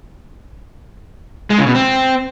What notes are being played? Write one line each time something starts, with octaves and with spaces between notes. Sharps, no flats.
G#3
C#3
B2
C4